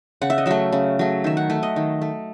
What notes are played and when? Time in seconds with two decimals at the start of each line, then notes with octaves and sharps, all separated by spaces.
0.22 C#3 F#5
0.30 E5
0.38 D#5
0.46 F#3 A3 E5
0.72 C#3
0.99 F#3 A3
1.24 D#3 E5
1.37 F#5
1.50 A3 E5
1.63 D#5
1.76 D#3
2.02 A3